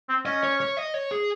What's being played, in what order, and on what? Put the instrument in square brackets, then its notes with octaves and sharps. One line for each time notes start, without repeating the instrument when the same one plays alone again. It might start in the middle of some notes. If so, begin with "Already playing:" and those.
[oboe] C4
[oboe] C#4 [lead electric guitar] D#5
[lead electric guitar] C#5
C#5
D#5
C#5
G#4